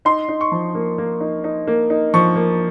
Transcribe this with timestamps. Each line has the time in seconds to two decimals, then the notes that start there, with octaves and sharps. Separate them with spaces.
0.05 D#4 C6
0.29 D#4
0.41 C#6
0.52 F3
0.75 A#3
0.98 A#3
1.20 D#4
1.44 D#4
1.67 A#3
1.90 D#4
2.14 F3 C#6
2.36 A#3